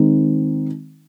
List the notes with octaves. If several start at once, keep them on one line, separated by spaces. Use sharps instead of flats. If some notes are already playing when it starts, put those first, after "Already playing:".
Already playing: D#3 G#3 C4 D#4